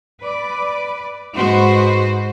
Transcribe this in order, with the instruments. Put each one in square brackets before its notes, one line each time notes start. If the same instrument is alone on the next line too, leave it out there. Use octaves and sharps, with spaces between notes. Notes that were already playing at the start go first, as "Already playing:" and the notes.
[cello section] B4 D5
G#2 G#3 F#4 B4 C5